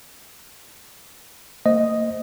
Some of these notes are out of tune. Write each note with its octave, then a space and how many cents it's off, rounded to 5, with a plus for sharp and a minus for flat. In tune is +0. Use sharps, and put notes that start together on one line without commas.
A#3 -35 C5 +0 D#5 +0